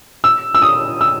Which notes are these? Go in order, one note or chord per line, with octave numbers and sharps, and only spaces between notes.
E6
E6
D#6
E6